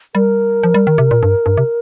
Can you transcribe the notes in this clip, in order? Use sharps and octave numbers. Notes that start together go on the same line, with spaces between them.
G3 A#4
F3
G3
D#3
C3
A#2
G2
G2
C3